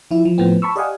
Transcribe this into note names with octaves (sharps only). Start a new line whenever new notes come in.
F3 E4
F3
A2 F3 B3 C4
A5 B5 C#6 E6
G4 D5 D#5 F5 F#5 G#5